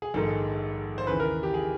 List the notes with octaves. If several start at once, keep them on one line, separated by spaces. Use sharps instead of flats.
G#4
A#1 G#2 D#3 G#3 A4
C5
D#2 C#3 E3 B4
A#4
G4
G#4